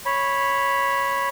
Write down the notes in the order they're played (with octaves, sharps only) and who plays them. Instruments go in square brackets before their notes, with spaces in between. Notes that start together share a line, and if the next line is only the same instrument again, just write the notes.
[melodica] C#5 B5